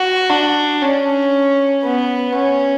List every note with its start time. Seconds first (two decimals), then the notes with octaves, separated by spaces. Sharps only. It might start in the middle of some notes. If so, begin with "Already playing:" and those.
Already playing: F#4
0.30 D4
0.82 C#4
1.84 B3
2.35 C#4